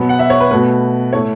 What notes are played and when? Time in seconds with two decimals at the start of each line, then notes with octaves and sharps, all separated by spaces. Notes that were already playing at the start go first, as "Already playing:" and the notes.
Already playing: B2 F#3 B3
0.09 F#5
0.19 E5
0.30 C#5
0.40 B4
0.51 B2 A3 B4
1.12 A2 A3 C#5